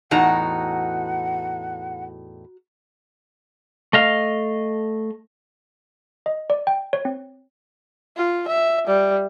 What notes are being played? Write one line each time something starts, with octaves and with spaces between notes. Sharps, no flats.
E2 A2 D#4 F#4 F#5 A#5
A3 D#5 F5
D#5
D5
G5
C#5
C4
F4
E5
G3